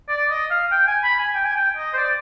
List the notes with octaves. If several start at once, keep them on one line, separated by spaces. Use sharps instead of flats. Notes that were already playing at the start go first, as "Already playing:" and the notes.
D5
D#5
F5
G5
G#5
B5
G#5
G5
G#5
G5
D#5
C5
D5